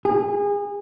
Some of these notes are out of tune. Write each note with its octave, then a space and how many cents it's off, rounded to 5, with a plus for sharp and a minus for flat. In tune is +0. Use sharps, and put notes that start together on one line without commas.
G#4 -30